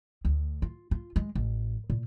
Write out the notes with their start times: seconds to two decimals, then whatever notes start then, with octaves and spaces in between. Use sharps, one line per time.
0.25 D2
0.62 F4
0.91 F4
1.16 G#3
1.35 A1
1.90 A#2